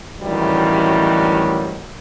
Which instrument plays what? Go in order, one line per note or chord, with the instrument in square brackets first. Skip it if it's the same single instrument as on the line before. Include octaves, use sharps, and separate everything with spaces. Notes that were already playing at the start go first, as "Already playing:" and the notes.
[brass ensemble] A1 D2 D#3 F#3 G3